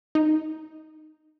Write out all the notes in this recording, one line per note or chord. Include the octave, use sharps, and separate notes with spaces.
D#4